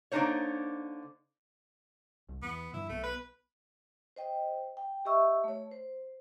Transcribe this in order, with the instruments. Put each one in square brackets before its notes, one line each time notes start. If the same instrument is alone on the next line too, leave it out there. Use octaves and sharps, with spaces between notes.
[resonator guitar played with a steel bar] D3 A#3 D4 D#4 C5 C#5
[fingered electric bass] C2
[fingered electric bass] E2 E3 [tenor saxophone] B3
[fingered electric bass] G2 D3 F3 [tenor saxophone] E4
[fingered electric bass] B1 B3 [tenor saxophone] A3
[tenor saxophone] B4
[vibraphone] C5 D#5 G5
G5
G4 D#5 E5 C#6 E6
A3 C#5
C5